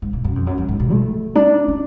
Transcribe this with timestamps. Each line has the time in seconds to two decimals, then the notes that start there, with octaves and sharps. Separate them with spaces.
0.02 G#2
0.13 B2
0.24 F#2
0.36 F2
0.47 F#2
0.58 F#2
0.69 G#2
0.80 B2
0.91 A3
1.35 D4
1.68 C#4